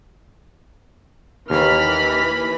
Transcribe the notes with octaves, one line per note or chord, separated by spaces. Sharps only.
D#2 E3 B5 F6